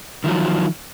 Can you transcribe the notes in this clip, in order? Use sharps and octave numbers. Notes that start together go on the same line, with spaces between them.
D#3 F3 F#3